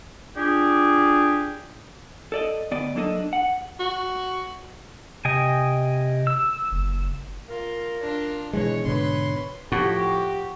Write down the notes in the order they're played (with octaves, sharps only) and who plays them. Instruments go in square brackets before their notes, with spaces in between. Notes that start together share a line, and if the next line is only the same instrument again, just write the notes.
[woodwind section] D4 F4 G4 G#4
[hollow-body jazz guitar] A4 D5 D#5
D2 B3 D5 D#5
F#3 A#3 D4 A4 D#5
D4
F#5
[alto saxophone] F#4
[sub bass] C3 [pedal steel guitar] D#5 G5 G#5
[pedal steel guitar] E6
[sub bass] F#1
[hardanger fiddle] F4 [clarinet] A#4
[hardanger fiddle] D4 F4
[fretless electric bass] B2 E3 G#3 [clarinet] B4 [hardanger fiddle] C#5
[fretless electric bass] G#2 B2 D3 [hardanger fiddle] B4 C6 [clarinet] C#5
[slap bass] A2 [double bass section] F3 [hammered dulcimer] F#4 [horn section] G4